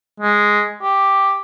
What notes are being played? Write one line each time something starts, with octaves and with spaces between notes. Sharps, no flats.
G#3
G4